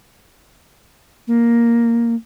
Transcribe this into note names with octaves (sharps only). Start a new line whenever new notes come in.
A#3